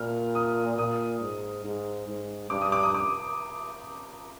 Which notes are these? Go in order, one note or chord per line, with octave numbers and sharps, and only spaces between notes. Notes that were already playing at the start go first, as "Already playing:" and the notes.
Already playing: A#2 F6
D#6
A#2 D#6
G#2
G#2
G#2
G2 D6
D#6
D6
D#6
D6